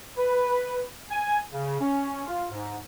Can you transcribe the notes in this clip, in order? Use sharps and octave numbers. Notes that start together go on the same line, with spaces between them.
B4
G#5
C#3
C#4
F4
G#2